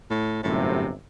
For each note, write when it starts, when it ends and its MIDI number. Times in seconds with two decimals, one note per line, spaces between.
0.10 0.40 45
0.43 0.92 31
0.43 0.92 42
0.43 0.86 45
0.43 0.92 48